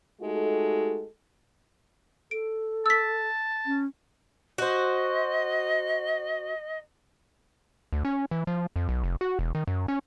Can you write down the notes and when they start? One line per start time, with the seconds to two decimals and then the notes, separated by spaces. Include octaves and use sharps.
0.22 G#3 A3 D#4 F#4 G4 A4
2.31 A4 D7
2.86 A5 E6 B6
3.66 C#4
4.58 F#4 C5 D#5
7.93 D2
8.05 C#4
8.31 E3
8.47 F3
8.76 F2
8.89 B1
9.04 F1
9.21 F#4
9.39 E1
9.55 D#3
9.67 F#2
9.88 C#4